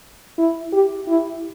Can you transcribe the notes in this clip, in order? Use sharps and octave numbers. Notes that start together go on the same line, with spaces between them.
E4
G4
E4